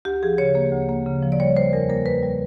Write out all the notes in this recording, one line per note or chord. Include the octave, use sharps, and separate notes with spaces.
D2 G4
F3 G#4
C#3 C#5
A#3
D2
A#3
C#3
F3
D5
G3 C#5
G3 C5
E2 A#4
A#3 A#4
E2 B4
G3